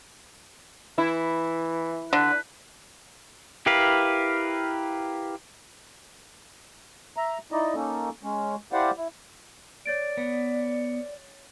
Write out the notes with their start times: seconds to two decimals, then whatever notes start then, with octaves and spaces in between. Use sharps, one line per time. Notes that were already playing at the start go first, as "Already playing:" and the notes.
0.98 E3 E4
2.13 D3 D4 B4
3.66 E4 G4 A#4 B4 F5
7.16 E5 A#5
7.52 D#4 E4 D5 D#5
7.75 A#3 C#4 D#4 A4
8.23 G#3 C#4
8.72 E4 G4 C5 D5 F5 F#5
8.97 E4
9.86 C#5 D5 A6 D7
10.17 B3